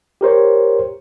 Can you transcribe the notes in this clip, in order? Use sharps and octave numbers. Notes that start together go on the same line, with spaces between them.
G4 A#4 C5 C#5